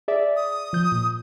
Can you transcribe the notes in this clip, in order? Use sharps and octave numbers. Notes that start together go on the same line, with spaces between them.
G#4 D5 E5
D#6
F3 G6
A#2